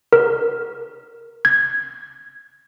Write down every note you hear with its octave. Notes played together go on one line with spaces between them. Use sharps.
A#4
G#6